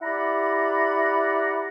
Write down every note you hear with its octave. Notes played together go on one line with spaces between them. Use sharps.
E4 G4 D5 F#5 A#5 B5